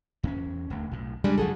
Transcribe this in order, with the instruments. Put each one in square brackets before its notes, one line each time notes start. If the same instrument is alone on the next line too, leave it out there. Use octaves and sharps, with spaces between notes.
[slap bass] E2 C4 C#4
D#1 D2
B1 A2
[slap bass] C#3 [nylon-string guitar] G3 G#3 D4
[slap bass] F#1 F3 [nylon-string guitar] F#3 G#4 A4